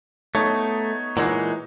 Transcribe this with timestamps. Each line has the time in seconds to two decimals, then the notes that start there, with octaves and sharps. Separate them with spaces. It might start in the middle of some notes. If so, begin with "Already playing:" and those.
0.35 A3 B3 D#4 C#5
1.17 A#2 E3 G#3 D#4 C#5 F#5